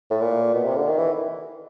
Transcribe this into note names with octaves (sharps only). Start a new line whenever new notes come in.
A2
A#2
B2
C3
D3
D#3
E3